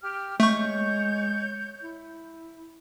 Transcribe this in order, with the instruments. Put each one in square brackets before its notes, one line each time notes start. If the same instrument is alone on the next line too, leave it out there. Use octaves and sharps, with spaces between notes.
[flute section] G4 F6
[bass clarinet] G#3 [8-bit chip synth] A3 C#6 [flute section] C#5 G6
[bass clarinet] E4